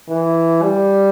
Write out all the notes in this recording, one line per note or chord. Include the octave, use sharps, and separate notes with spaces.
E3
G3